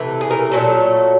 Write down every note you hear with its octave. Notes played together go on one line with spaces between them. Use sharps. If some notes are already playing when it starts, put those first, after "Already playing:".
Already playing: C3 E3 A3
G#4
A#4
A#2 F#3 A3 A4